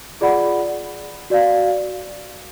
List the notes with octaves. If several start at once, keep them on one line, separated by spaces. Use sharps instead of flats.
F4 G#4 D5 F#5 B5
F#4 D5 F5